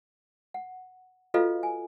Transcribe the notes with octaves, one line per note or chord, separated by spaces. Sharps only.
F#5
F4 F#4 A4 B4 D#5 F5
G#5